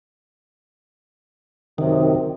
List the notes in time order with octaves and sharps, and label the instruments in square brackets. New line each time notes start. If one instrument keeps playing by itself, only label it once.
[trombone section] F#2 C3 [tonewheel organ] D#3